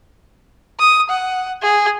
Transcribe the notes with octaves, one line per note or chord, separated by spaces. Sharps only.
D#6
F#5
G#4